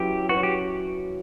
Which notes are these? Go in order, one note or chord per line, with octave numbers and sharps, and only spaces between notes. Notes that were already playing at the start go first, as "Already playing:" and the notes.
Already playing: F#3 C#4 E4 G4 B4
F#3 C#4 E4 F#4 B4
G4